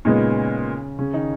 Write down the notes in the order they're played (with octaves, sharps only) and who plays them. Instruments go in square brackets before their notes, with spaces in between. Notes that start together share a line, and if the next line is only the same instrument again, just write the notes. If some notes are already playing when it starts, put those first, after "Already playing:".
[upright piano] A#2 G#3 B3 D#4 [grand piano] C#3 C#4
[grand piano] C#3 C#4
D#3 D#4